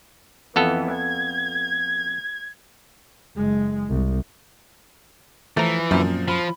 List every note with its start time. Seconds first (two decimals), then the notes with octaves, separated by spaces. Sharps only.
0.56 F2 E3 B3 A4
0.93 G#6
3.36 F#1 G#3
3.89 C2
5.57 E3 F3 A3 A#5
5.91 F#2 A#2 F3 C4
6.28 F3 B5